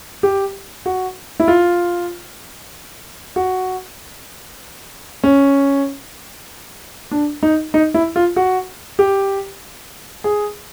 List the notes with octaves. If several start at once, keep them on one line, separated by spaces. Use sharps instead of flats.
G4
F#4
E4
F4
F#4
C#4
D4
D#4
D#4
E4
F4
F#4
G4
G#4